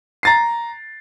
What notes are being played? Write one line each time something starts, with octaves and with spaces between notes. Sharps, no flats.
A#5 A6 C7